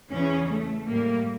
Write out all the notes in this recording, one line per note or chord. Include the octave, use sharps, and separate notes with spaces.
E2 C#3 E3 C#4
A3
A2 G3 A#3